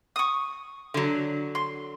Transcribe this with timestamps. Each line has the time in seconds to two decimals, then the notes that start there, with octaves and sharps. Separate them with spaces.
0.16 C#6 D#6
0.94 D3 F#3
1.55 C6